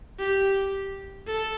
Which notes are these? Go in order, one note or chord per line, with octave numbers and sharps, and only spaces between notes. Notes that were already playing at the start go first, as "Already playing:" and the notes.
G4
A4